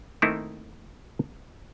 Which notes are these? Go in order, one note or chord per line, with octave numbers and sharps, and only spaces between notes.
D#3 A3 A#3 C4 D#4 E4